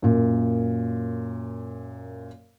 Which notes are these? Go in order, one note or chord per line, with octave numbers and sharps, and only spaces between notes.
F#2 A#2